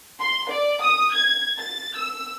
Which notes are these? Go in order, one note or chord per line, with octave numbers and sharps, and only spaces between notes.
C6
D5
D#6
G#6
A6
E6